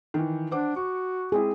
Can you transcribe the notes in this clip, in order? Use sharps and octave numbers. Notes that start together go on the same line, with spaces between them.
D#3 E3
D4 C5 F#5 D6
F#4 C#6
G#3 C4 E4 G#4